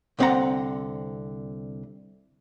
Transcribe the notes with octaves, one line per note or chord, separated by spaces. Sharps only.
C2 D3 C4 F5 F#5 A#5